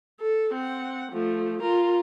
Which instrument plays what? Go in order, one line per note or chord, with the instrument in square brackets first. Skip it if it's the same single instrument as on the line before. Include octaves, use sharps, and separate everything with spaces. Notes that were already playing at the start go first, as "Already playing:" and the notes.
[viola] A4
C4 F#5
F3 A3
F4 A#4